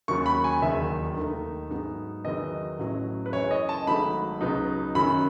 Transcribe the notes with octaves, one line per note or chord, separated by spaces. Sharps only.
D#2 D#3 F#3 C#4 C#6
B5
G#5
E1 D#2 D#3 F#3 E5
D#2 D#3 A3 D#4
G#2 F#3 B3 D#4
E2 D#3 F#3 D#5
A1 A2 F#3
B4
F#2 C#3 E3 C#5
D#5
A5
G#1 G#2 F#3 A3 D#4 B5
C#2 B2 F#3 B3 D#4
F#2 D#3 F#3 C#4 B5